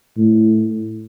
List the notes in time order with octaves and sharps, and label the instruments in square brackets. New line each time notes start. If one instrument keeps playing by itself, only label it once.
[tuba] A2